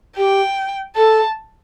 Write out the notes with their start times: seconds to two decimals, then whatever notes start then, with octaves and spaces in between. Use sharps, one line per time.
0.17 G4 G5
0.95 A4 A5